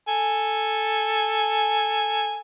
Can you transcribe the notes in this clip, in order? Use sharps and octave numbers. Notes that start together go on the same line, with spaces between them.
A4 G#5